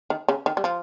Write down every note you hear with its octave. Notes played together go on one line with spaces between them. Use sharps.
D#3
C#3
D#3
G3
F3